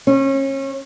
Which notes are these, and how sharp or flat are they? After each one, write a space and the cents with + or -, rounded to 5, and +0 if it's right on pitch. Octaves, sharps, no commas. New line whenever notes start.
C#4 -30